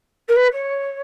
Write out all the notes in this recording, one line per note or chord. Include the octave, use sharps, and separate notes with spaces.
A#4
B4
C#5